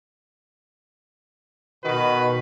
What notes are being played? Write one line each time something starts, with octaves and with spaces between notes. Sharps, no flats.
B2 D#3 F#4 B4